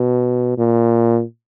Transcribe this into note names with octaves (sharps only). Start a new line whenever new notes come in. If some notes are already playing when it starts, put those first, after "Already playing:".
Already playing: B2
A#2